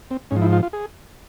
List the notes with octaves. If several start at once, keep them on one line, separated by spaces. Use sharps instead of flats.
C4
G#2 C#4
F3
E4
F4
F4
G#4